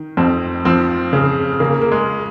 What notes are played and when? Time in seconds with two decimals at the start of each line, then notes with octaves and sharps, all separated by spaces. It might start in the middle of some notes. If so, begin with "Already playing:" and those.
Already playing: D#3
0.17 F2 C4
0.65 F3 C4
1.13 C#3
1.60 C#3 A#3
1.81 A#3
1.92 G#3